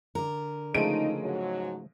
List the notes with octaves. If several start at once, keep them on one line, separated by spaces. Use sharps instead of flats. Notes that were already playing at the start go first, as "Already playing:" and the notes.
D3 A#4
C#3 F3 G#3 A3 D#4 D7 D#7
G#2 F#3